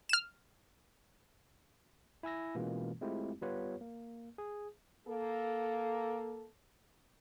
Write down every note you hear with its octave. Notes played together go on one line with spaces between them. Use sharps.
F6 E7
E4 G#5 E6 A#6
B2 E3 G#3 A#3 C#4 F4
G#3 A3 C4 E4 F4 G4
G3 B3 F4 G4 B4 C#5
A#3
G#4
A#3 A4